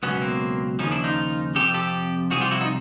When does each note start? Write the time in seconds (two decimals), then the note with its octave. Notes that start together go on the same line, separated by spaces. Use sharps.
0.03 C#2 B2 F#3 B3 C#4
0.22 A#3 C4
0.79 D#2 C#3 F3 C#4 D#4
0.92 D4 E4
1.04 D#4 F4
1.55 F2 C3 F3 G4 A4
1.74 G4 A4
2.31 C2 C3 F3 F#4 G#4
2.41 F4 G4
2.51 E4 F#4
2.61 D#4 F4